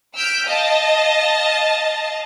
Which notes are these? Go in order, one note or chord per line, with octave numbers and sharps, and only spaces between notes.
E6 F6 G6 B6 D7
D#5 F5 A5